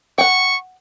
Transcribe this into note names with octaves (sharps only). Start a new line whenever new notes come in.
F#5 G5 C#6